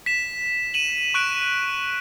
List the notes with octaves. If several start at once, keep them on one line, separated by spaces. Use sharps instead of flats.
B6 E7
D#7 E7 F#7
C#6 F#6 D7